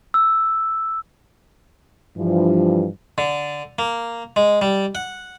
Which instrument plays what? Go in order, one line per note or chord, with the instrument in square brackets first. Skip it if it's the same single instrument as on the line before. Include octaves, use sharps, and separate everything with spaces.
[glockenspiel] E6
[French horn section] G2 E3 F3
[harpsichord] D3
A#3
G#3
G3
F#5